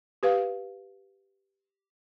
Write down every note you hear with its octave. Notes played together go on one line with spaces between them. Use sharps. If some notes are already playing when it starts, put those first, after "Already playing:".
G4 B4 F5